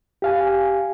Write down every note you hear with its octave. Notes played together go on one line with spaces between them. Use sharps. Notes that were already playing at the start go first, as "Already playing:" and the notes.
G4 F5 G#5